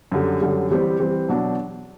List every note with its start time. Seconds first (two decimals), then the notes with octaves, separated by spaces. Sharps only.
0.12 F#2 D3 G3
0.41 F#2 D3 G3
0.70 E3 G3 C4
1.00 E3 G3 C4
1.29 B2 F#3 B3 D4